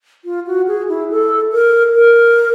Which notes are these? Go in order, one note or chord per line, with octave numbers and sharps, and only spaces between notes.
F4
F#4
G#4
E4
A4
A#4
A#4